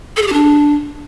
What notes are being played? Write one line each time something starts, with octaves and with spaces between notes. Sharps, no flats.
A4
G#4
G4
D4